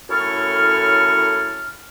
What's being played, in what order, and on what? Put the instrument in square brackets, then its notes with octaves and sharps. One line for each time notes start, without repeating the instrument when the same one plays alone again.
[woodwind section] F#2 A2 E4 A4 C#6 F6